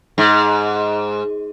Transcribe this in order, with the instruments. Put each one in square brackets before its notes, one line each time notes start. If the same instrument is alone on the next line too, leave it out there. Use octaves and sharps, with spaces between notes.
[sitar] G#2